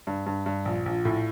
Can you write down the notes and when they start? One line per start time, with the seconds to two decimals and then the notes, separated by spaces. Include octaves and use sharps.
0.07 G2
0.26 G2
0.46 G2
0.65 A#1
0.86 A#1
1.05 A2